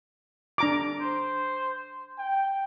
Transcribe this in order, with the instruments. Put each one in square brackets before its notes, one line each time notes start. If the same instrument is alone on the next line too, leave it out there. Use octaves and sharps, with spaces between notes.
[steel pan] D4 A#5 D6
[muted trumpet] C5
G5